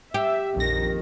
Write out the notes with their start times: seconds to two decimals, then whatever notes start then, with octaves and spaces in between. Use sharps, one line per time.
0.14 G4 E5
0.56 A#1 F2 D#3 A#6